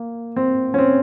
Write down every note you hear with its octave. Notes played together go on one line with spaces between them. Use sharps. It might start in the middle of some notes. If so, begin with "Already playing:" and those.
Already playing: A#3
C4
C#4
C4